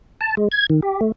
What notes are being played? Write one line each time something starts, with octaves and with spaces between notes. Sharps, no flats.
A5
G#3
G#6
D#3
G4
A3